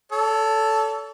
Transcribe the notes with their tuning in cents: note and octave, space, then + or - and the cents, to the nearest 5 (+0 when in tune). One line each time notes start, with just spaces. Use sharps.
A4 +0 C#5 +40